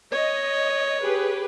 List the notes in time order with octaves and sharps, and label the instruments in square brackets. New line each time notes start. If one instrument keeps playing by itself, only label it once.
[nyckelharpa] C#5 [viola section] D#5
[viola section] G4 G#4 B4